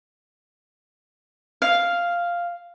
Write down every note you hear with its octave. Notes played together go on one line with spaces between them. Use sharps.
F5